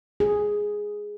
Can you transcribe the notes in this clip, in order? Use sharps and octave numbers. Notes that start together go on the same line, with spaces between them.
G#4